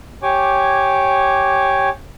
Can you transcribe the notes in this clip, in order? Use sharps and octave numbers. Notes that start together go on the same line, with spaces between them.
G4 C#5 G#5 D6